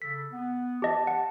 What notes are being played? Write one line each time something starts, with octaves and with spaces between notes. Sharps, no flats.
C#3 A4 B6
B3
G4 D#5 A5
F#5